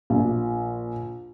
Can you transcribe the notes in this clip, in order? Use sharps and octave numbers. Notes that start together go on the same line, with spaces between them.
A#1